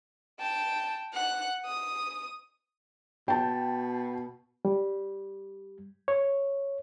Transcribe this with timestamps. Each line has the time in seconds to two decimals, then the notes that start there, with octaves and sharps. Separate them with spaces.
0.40 G5 A5
1.13 F#5 F#6
1.65 D#6
3.28 B2 G5 A5
4.65 G3
6.08 C#5